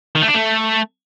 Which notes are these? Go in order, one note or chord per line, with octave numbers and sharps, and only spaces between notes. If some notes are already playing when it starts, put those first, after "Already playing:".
D#3
A3
D4
A3